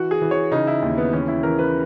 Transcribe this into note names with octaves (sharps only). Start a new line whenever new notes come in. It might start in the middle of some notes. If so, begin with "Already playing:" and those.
Already playing: E3 F#4
G#4
E3
C#5
C#3 D#4
E4
D#2
B3
E3 C#4
E4
E3 A#4
B4